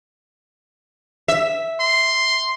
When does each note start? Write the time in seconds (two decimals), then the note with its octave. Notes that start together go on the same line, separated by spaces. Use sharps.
1.28 E5
1.80 C6